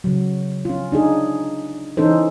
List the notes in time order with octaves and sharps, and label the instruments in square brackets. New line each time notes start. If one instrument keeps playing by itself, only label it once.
[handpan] C#3 F#3
C#4 F4
D4 D#4 G#4
E3 C#4 D#4 A4 C5